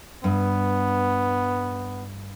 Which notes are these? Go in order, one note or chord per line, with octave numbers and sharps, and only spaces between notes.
G2 B3